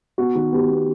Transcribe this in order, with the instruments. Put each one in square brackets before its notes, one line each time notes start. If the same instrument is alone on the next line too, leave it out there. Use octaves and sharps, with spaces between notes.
[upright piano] B3 F#4
D#3
B3 G4
B3